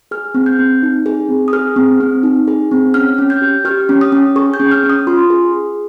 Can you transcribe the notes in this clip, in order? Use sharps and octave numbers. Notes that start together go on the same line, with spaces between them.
G#4 F6
C4
G6
C4
D#4
G#4
C4
D#6
G#4 F6
C4
C4
D#4
G#4
C4
C#4 F6
C#4
G6
G4
G4 F6
C#4
D#6
C#4
G#4 C#6
G6
C#4
F6
C#4
D#6
F4 C6
G#4